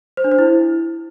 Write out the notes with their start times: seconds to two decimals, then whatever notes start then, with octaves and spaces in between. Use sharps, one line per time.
0.17 C5
0.24 D4
0.31 C5
0.39 E4